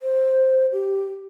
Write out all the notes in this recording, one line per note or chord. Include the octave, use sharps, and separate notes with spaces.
C5
G4